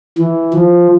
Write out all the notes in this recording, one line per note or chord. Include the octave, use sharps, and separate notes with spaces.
E3
F3